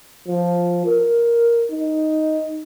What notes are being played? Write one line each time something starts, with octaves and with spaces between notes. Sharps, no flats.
F3
A#4
D#4